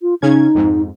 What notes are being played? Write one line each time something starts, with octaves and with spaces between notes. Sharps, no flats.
F4
C#3 C#4 D#4 G#6
F2 G#2